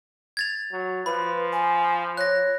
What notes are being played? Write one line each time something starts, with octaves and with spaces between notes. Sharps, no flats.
G#6 A6 F7
F#3
F3 B4 B5
G#5
C#5 F#6 A#6